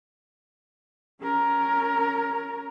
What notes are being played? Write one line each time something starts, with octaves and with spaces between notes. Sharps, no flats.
C#4 A#4